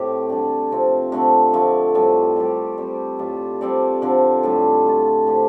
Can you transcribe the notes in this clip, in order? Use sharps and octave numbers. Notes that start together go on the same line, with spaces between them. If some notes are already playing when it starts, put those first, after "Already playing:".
Already playing: A2 A3 C4 G4
D3 G3 D4
C3 F3 C4
D3 A3 C4
D3 F3 A3
A2 G3 C4 A4
G3 C4 G4 D5
G3 C4 A4
A2 G3 F4
G3 C4 A4 D5
D3 F3 C4
A2 G3 D4
A3 F4 A4
A2 F3 D4 G4